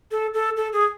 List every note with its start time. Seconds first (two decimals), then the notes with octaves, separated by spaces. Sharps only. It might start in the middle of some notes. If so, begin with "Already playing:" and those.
0.11 A4
0.34 A4
0.57 A4
0.73 G#4